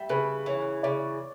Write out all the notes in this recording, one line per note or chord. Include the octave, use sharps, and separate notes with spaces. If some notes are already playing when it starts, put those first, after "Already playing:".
Already playing: G3 E5
C#3 B4
E3 C#5
C#3 D5